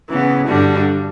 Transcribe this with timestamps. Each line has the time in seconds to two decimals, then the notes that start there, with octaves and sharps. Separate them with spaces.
0.10 C#3 E3 B3
0.47 G2 D3 G3 D4 F#4